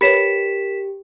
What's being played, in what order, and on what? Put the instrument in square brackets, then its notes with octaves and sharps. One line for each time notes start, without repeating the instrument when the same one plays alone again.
[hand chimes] G4 [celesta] A#4 B6 E7 [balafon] B4 C#5 B5